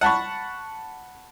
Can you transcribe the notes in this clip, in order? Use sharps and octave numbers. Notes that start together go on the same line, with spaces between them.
F#5 A5 B5 C#6